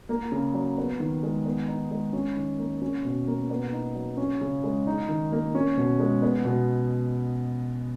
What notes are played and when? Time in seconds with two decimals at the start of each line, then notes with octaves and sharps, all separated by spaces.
0.09 A#3
0.32 C#3
0.54 F#3
0.77 B3
1.00 D#3
1.23 G#3
1.45 B3
1.68 D#4
1.91 G#3
2.13 C#4
2.36 D#3
2.59 A#3
2.82 C#4
3.05 B2
3.27 A#3
3.50 B3
3.73 D#4
3.95 F#3
4.17 C#4
4.41 C#3
4.64 G#3
4.87 D#4
5.09 D#3
5.32 A#3
5.55 C#4
5.77 B2
6.00 G#3
6.22 B3
6.45 B2